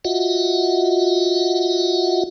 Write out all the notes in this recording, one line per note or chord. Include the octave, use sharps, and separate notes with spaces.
F4 F#4 D#5 E5 F#5